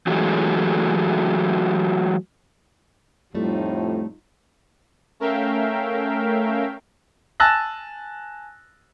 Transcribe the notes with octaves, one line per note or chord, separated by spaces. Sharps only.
E3 F#3 G#3 A3 G4
F2 A2 G3 A3 D#4 F4
A3 C#4 A#4 E5 F5 G5
G#5 A5 E6 F#6 A6 A#6